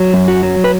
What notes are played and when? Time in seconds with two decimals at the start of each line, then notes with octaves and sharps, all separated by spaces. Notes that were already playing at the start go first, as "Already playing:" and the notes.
Already playing: F#3
0.14 F#2
0.28 F#4
0.43 F#3
0.64 B4